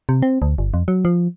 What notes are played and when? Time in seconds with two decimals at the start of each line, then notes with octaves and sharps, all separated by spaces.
0.09 C3
0.22 C4
0.42 D2
0.58 G1
0.74 F2
0.88 F#3
1.05 F3